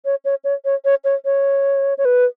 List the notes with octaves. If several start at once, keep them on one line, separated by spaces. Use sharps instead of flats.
C#5
C#5
C#5
C#5
C#5
C#5
C#5
C#5
B4